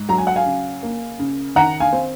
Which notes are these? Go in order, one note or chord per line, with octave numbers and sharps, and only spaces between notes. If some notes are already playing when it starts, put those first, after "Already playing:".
Already playing: G#2
F#3 A#5
G#5
F#5
F5 G#5
C#3
A#3
C#3
D#3 F#5 A#5
F5 G#5
C4